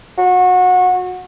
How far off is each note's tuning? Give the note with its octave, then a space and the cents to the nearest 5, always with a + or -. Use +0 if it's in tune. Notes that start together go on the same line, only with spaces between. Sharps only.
F#4 -25